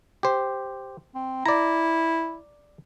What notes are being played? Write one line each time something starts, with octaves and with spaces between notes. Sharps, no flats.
G4 C5
C4
E4 D5 A#5